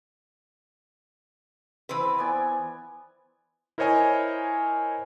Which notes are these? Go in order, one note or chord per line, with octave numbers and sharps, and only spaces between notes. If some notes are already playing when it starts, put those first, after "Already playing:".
E3 C4 B4
B3 D5 G#5
E4 A#4 C5 C#5 D#5 G#5